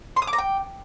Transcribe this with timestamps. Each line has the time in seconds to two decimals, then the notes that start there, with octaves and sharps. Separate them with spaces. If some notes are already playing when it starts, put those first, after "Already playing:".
0.16 C6
0.22 D#6
0.27 D6
0.33 A#5
0.38 G5